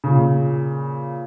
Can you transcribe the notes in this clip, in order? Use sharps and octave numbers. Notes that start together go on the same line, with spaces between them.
A#2 C#3